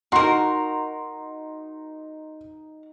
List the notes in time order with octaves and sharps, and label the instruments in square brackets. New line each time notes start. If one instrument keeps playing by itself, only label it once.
[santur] D#4 [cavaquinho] F#4 A#4 [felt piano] C6